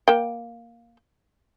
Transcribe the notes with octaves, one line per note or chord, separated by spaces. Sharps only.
A#3 G5